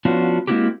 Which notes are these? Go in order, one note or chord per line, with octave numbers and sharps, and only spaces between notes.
F3 B3 C#4 D4 F4 F#4
G#3 A#3 C4 E4 F#4 G4